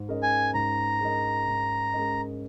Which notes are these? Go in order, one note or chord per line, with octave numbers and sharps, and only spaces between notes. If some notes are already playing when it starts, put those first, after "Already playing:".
Already playing: G#2
G#3 C#4 A#4 D#5
G#5
G#2 A#5
G#3 C#4 A#4 D#5
G#2
G#3 C#4 A#4 D#5